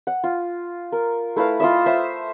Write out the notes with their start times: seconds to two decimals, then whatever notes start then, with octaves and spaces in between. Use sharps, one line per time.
0.07 F#5
0.24 F4
0.92 A#4
1.36 A3 E4 B4 F5
1.60 F4 D#5 E5
1.86 C5 E5